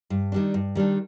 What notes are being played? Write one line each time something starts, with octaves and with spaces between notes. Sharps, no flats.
G2
D#3 G3 D4
G2
D#3 G3 D4